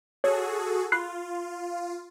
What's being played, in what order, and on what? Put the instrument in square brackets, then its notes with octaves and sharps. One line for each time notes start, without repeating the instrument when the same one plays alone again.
[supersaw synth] F#4 G#4 A4 [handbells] C#5
[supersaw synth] F4 [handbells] B5 F#6 C7